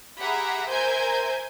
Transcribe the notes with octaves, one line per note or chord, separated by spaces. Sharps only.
G4 G#4 E5 F#5 A#5 B5
A#4 C5 E5 G#5 G6 G#6